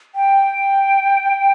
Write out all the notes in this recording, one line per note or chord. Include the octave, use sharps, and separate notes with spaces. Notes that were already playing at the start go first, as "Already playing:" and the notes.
G5